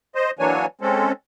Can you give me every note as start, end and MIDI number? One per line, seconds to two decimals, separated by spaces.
0.15 0.31 72
0.15 0.31 75
0.39 0.66 52
0.39 0.66 54
0.39 0.66 58
0.39 0.66 62
0.39 0.66 73
0.39 0.66 80
0.81 1.12 56
0.81 1.12 60
0.81 1.12 61
0.81 1.12 69